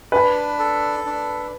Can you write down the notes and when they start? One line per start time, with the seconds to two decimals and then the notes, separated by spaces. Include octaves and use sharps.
0.12 D4 B4
0.59 A4
1.06 D4